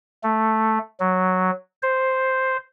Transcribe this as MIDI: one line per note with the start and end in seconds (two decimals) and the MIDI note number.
0.24 0.79 57
1.00 1.51 54
1.83 2.57 72